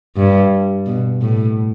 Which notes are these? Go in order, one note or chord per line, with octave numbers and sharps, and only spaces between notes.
G2
B2
A2